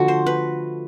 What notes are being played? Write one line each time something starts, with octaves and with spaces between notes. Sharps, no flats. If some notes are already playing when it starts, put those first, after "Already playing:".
Already playing: D3 F3 A3 F#4
C5
B4